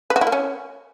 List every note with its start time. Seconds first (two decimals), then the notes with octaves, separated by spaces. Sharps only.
0.10 B4
0.16 F#4
0.21 E4
0.27 A#3
0.32 C#4